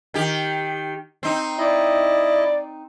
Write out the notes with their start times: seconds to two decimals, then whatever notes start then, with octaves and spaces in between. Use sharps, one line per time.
0.14 D#3 G4
1.23 C4 D#4
1.58 E4 D5 D#5